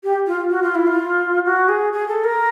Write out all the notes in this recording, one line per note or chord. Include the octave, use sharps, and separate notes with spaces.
G4
F4
F#4
F4
E4
F4
F#4
G#4
G#4
A4
A#4